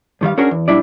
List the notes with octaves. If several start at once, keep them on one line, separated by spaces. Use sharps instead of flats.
G2 D#3 G3 F5
C#4 D4 F#4 G#4 A#4 C#5
E2
B1 F2 G3 D4 E4 D5